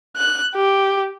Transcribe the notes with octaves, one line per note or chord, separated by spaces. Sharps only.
F#6
G4